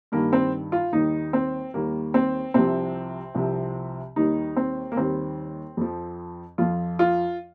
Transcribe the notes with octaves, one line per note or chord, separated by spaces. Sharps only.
G2 D#3 G3 A#3
C4
F4
D#2 D#3 G3 D#4
C4
D#2 D#3 G3 A#3
C4
C2 C3 F3 C4
C2 C3 F3
D#2 D#3 G3 D#4
C4
A#3
D#2 D#3 G3 C4
F2 F3
F2 F3 F4
F4